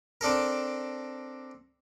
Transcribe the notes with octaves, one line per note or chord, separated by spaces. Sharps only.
C4 D4 A4 A#4